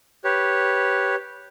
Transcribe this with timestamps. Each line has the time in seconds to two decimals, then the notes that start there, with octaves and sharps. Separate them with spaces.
0.24 G4 B4 C#5